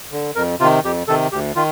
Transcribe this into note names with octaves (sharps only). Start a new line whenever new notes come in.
D3
F2 A#4
C3 D#3 F4
F2 G4
C3 D#3 A4
D2 G4
D#3 F4